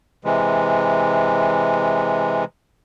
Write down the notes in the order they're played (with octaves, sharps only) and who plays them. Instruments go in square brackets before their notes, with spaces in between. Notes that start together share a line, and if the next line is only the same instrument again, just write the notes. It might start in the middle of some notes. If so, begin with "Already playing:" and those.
[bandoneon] C3 E3 G#3